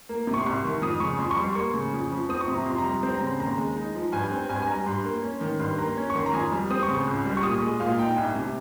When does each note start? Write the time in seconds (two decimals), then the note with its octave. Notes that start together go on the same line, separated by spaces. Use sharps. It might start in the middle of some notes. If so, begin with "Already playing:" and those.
0.09 A#3
0.27 C3
0.34 C#6
0.41 C6
0.46 C2 C#6
0.64 D#3
0.82 F2 D#6
1.00 C#3 C#6
1.19 F2 C6
1.31 C#6
1.37 G3
1.43 C6
1.55 A#3 C#6
1.74 C#3
1.93 F2
2.11 F3
2.29 C4 D#6
2.41 C#6
2.48 C3
2.54 A#5
2.65 F2 C6
2.78 A#5
2.84 G3
3.03 C4 C6
3.15 A#5
3.20 C#3
3.26 C6
3.40 D#2 A#5
3.58 G#3
3.77 D#4
3.95 F3
4.12 G2 G#5
4.31 C4
4.49 G2 G#5
4.62 G#5
4.67 G3 A#5
4.86 G2 C6
5.05 A#3
5.23 C#4
5.41 D#3
5.60 G2 C6
5.78 A#3 A#5
5.97 C#4
6.10 C#6
6.15 D#3 C6
6.26 A#5
6.33 F2 G#5
6.52 G3
6.71 C4 D#6
6.83 C#6
6.88 C#3
6.94 C#6
7.07 C#2
7.25 G3
7.37 C#6
7.43 A#2 D#6
7.62 G#3
7.80 A#2 F5
7.99 D#4 G5
8.16 C2 G#5
8.35 C3